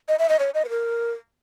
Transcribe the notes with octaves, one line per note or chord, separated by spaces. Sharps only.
D#5
E5
D#5
C#5
D#5
B4
A#4